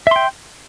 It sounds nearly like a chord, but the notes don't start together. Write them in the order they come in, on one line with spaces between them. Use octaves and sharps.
E5 C6 G5